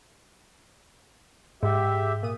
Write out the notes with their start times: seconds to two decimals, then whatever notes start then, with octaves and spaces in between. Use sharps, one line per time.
1.63 G#2 G4 E5
2.23 A#2 D#6